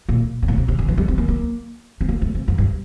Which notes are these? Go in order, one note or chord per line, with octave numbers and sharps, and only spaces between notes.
A#2
A#2
A2
C3
C3
D3
E3
G3
C4
A#3
A#3
C4
A#3
A3
C3
F2
G2